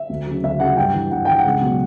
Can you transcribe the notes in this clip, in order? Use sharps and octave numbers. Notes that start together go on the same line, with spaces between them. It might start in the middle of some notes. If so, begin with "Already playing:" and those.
Already playing: E5
D2
C#3 F#3
D2 E5
C#3 F#3 F#5
G2 G5
E3
G2 F#5
E3 G5
F#5
C#2
B2 F#3